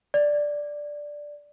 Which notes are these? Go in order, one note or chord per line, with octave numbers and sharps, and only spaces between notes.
D5